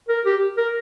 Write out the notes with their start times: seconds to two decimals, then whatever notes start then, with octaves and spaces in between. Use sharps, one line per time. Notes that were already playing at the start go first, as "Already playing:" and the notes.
0.09 A#4
0.25 G4
0.57 A#4